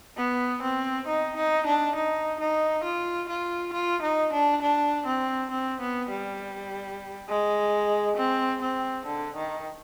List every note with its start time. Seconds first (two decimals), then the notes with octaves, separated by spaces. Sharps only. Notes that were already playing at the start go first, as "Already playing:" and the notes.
0.17 B3
0.63 C4
1.07 D#4
1.36 D#4
1.66 D4
1.95 D#4
2.40 D#4
2.84 F4
3.29 F4
3.73 F4
4.02 D#4
4.33 D4
4.62 D4
5.06 C4
5.51 C4
5.81 B3
6.10 G3
7.29 G#3
8.17 C4
8.61 C4
9.06 D3
9.36 D#3